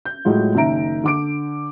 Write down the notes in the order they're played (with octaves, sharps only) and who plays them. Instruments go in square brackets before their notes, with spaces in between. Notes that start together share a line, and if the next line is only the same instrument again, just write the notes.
[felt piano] G6
A2 F#3 G#3 F4
F#1 D#3 E5 A#5 D7
D3 D6 D7